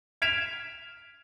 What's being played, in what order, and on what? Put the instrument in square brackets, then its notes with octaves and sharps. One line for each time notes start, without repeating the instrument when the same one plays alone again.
[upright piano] F6 G#6 B6 D7 E7 F7